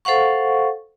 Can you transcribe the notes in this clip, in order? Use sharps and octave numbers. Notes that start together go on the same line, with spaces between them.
A4 C5 F5 F#5 C#6